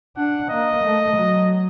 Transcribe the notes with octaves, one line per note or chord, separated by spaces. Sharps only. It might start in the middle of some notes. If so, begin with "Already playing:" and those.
D4 F#5
A#3 D#5
A3
F#3